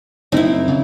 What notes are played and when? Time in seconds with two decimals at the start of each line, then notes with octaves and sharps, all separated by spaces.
0.32 F#1 C4 D#4 E4
0.68 C#3